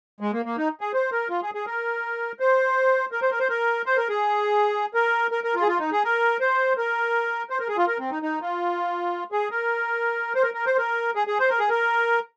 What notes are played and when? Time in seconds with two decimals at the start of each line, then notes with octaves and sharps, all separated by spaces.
0.20 G#3
0.33 A#3
0.45 A#3
0.57 D#4
0.81 G#4
0.94 C5
1.12 A#4
1.30 F4
1.42 G#4
1.54 G#4
1.66 A#4
2.40 C5
3.12 A#4
3.22 C5
3.31 A#4
3.40 C5
3.49 A#4
3.86 C5
3.97 A#4
4.09 G#4
4.94 A#4
5.31 A#4
5.44 A#4
5.55 F4
5.62 G#4
5.67 F4
5.79 D#4
5.92 G#4
6.04 A#4
6.40 C5
6.77 A#4
7.50 C5
7.59 A#4
7.69 G#4
7.77 F4
7.87 A#4
7.99 C4
8.11 D#4
8.22 D#4
8.42 F4
9.32 G#4
9.51 A#4
10.35 C5
10.42 A#4
10.54 A#4
10.66 C5
10.78 A#4
11.15 G#4
11.27 G#4
11.40 C5
11.49 A#4
11.59 G#4
11.69 A#4